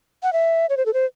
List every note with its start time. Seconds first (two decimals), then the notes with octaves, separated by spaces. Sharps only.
0.23 F#5
0.33 E5
0.69 C#5
0.77 C5
0.86 A4
0.94 C5